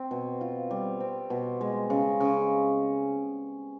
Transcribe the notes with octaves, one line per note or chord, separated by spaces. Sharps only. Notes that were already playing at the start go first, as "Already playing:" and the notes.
Already playing: C4
B2
F4
G3
C4
B2
G#3
C#3
C#3